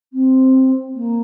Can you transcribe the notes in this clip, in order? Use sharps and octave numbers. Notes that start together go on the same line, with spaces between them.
C4
A#3